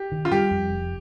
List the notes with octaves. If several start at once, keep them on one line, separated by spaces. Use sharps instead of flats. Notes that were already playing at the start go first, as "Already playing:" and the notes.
Already playing: G4
D#3
F4
G3 G4
F2
F1